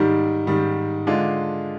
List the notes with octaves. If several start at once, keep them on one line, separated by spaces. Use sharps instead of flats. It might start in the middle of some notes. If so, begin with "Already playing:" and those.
Already playing: G#2 D#3 G3
G#2 D#3 G3
D3 G#3 D4 F4